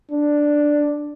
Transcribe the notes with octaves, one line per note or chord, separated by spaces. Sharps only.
D4